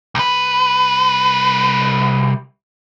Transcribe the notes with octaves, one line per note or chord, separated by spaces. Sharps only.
C2 B4